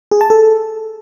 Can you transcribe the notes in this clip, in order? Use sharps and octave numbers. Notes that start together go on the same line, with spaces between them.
G#4
A5
A4